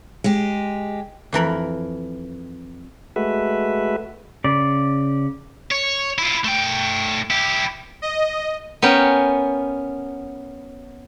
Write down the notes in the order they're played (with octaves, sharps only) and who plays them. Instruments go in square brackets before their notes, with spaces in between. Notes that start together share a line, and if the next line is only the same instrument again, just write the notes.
[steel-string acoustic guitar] G#3 G4
[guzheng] F2 E3 A#4 B5
[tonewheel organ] G#3 A3 F#4 B4 E5
[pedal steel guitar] C#3 D5
[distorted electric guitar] C#5
E4 F4
A3 G5
E4 G4
[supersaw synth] D#5
[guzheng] B3 C#4 A#4 G5